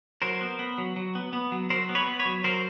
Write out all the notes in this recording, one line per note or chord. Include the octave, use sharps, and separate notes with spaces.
F#3 A#4 C5
B3
B3
F#3
F#3
B3
B3
F#3
F#3 A#4 C5
B3
B4 C#5
B3
B4 C#5
F#3
F#3 A#4 C5